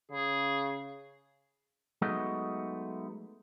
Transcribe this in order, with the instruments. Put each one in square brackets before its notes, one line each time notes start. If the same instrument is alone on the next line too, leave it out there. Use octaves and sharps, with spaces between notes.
[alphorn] C#3 [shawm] G#4
[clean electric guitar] F#3 G#3 A3 B3 D#4